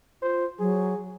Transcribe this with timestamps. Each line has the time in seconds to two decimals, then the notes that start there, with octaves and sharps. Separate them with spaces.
0.22 F4 C5
0.59 F#3 G#4